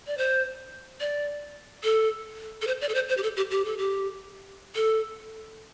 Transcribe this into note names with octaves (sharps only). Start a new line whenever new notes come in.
D5
C5
D5
A4
A4
C5
D5
A4
C5
C5
G4
A4
G4
G4
A4
G4
A4